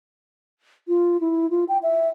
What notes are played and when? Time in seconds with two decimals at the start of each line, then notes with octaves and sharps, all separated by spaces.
0.88 F4
1.21 E4
1.50 F4
1.69 G5
1.83 E5